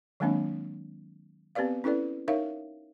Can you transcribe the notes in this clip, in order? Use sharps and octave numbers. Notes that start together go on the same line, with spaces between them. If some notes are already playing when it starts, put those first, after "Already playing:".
D#3 F#3 G#3 A#3 C4 D4
B3 C4 G4 B4 D5 F5
C#4 E4 A4 B4 D5
D#4 A#4 C#5 E5 F5